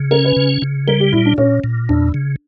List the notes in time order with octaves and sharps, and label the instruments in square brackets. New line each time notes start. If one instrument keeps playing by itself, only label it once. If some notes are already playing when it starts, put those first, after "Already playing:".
Already playing: [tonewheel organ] C#3
[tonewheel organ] C#4 [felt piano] A#4
[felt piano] B4
[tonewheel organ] C#3
C#3
[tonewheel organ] G3 [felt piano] A#4
[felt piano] G4
[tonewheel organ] A#2 [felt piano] E4
[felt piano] D4
[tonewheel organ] A#2 [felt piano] C#4
[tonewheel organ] A#2
[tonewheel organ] E2 [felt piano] D4
[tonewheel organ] C#3